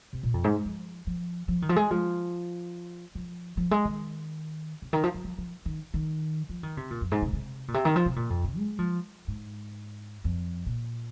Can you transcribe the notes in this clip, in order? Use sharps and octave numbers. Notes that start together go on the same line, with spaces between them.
C3
A#2
F2
G#2
F3
F3
F3
D#3
F3
G#3
F3
F3
F3
G#3
D#3
C3
D#3
F3
F3
F3
F3
D#3
D#3
F3
D#3
C3
A#2
F2
G#2
C3
C3
A#2
C3
D#3
F3
C3
A#2
F2
C3
G#3
F3
G#2
F2
A#2